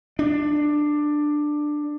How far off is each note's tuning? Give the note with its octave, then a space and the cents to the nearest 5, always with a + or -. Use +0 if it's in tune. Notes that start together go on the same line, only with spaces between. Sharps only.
D4 +15